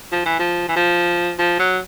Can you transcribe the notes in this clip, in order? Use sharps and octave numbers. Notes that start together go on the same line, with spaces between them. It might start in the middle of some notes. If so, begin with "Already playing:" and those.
F3
E3
F3
E3
F3
F3
F#3